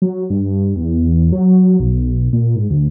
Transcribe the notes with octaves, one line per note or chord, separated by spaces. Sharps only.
F#3
G2
E2
F#3
B1
A#2
G#2
D2